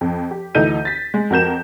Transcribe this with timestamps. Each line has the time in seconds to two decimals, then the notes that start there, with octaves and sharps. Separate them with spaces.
0.01 F2
0.31 G4
0.55 D2 E3 D#4 A4 G6 D#7
0.85 A6 B6
1.14 G#3
1.30 F2 F#4 A#4 G6 E7